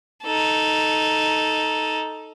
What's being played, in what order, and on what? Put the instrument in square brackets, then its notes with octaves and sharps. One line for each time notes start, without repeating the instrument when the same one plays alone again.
[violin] D#4 A4